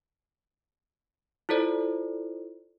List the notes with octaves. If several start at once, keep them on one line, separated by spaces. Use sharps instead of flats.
E4 F4 A4 C5 D5